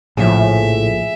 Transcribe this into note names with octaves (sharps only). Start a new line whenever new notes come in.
A#1 A2 C#3 F3 G#4 E5